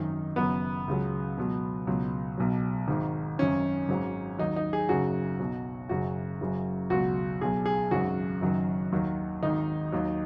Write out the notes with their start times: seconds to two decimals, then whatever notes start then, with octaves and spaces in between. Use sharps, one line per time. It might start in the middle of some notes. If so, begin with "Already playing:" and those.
Already playing: G#1 F#2 D#3 D#4
0.36 F#1 F#2 F#3 B3
0.88 C#2 C#3 F#3
1.38 C#2 B2 F#3
1.87 C#2 B2 F#3
2.38 B1 B2 F#3
2.88 G#1 G#2 D#3
3.38 G#1 F#2 D#3 C#4
3.89 G#1 G#2 F#3
4.38 D#2 D#3 F#3 D#4
4.56 D#4
4.73 G#4
4.89 F#1 F#2 C#3 F#3 F#4
5.39 B1 B2 F#3
5.89 F#1 F#2 C#3 F#4
6.41 F#1 F#2 C#3 F#3
6.90 C#2 B2 F#3 F#4
7.41 B1 B2 F#3 G#4
7.66 G#4
7.91 G#1 F#2 C#3 F#3 F#4
8.41 F#1 F#2 D#3 F#3
8.92 D#2 D#3 F#3
9.43 G#1 G#2 D#3 D#4
9.92 D#2 D#3 F#3